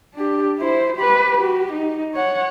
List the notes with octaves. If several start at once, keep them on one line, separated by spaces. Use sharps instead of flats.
D4 G4
E4 C5
G4 B4
F#4 G4
D#4
C#5 F#5